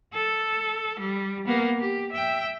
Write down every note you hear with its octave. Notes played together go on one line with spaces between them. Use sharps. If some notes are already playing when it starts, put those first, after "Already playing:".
A4
G3
A#3 B3
G4
E5 G5